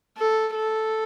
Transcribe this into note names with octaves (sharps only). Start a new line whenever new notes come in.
A4
A4